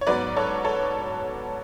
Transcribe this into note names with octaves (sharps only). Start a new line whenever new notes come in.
C#5
G#2 F#3 B3 B4 D5
A4 C#5
A4 C#5